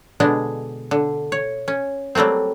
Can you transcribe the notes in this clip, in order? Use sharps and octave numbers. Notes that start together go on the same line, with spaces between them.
B2 D3 G#3 D4
D3
C#5
C#4
F#3 G3 A3 A#3 C4